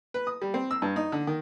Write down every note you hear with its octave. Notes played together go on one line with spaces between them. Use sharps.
B4
D#6
G3
C4
E6
G2
D#4
D3
D#3